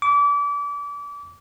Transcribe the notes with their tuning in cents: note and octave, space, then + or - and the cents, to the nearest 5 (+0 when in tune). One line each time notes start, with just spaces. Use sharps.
D6 -30